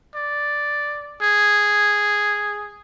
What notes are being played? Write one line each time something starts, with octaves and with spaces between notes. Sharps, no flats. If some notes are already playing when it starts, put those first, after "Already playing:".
D5
G#4